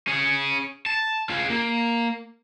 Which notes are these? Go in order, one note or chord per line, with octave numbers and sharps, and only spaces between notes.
C#4 G#4
A5
F4 G#4
A#3